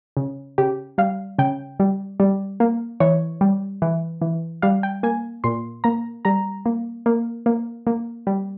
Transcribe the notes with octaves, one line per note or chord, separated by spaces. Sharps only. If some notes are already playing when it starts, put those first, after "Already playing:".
C#3
C#3 G4
G3 F5
C#3 G5
G3
G3
A#3
E3 C#5
G3
E3
E3
G3 F5
G5
A#3 G#5
A#2 C6
A#3 A#5
G3 A#5
A#3
A#3
A#3
A#3
G3